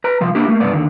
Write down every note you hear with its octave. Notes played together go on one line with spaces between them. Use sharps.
B4 A#5
C2 F3 F5
A#3 D4 E4 G4
A3 A#3
C2 G2 B3 D5
D#2 D3